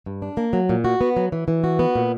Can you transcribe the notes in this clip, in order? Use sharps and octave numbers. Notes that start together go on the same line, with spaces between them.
G2
D4
A#3
F#3
A#2
F#4
B3
F#3
E3
E3
F#4
B3
A#2